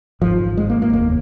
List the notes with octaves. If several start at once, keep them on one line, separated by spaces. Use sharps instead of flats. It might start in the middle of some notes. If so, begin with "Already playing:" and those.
G#1 G#2 F3
G#1 G#2 G#3
A#3
A#3
F1 D#2 A#3